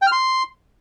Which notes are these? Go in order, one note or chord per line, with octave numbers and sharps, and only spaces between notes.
G5
F6
C6